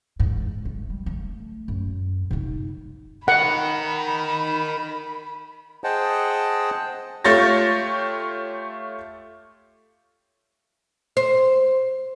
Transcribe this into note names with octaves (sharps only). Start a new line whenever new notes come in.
E2 G#2
A3
G3
A3
F#2
C3 D#4
A#4 D#5 F#5 B5
G#4 C5 D#5 F#5 G5 A5
A3 F4 G4 C#5 A6 A#6
C5